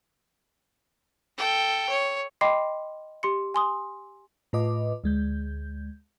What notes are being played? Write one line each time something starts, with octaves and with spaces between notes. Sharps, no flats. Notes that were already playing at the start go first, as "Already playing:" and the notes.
A4 G5
C#5
D#5 G5 B5 C6 D6 C7
G4 C6 C#7
G#5 C6 D#6
A2 F4 B4 D#5 D6
D2 G#3 G6